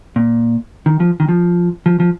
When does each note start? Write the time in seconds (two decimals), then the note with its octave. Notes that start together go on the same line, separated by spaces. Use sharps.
0.16 A#2
0.86 D#3
1.00 F3
1.20 D#3
1.29 F3
1.86 F3
2.00 F3